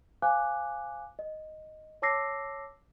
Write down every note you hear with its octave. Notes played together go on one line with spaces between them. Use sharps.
C5 F5 G#5 D6 F#6
D#5
C#5 A5 D6 E6 A#6 C7